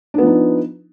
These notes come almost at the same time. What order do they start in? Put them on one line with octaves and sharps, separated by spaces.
D4 B3 F3 D#4